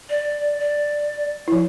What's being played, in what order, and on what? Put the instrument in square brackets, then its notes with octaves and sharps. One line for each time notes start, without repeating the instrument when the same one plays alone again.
[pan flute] D5
D5
[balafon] F3 E4